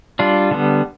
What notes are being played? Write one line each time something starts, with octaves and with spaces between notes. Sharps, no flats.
G3 D4 F4
D3 G3 B3